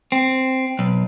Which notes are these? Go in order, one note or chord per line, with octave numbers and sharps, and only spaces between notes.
C4
B1